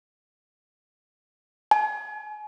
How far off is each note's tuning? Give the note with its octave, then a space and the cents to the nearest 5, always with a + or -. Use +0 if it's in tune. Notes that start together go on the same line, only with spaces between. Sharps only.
G#5 +35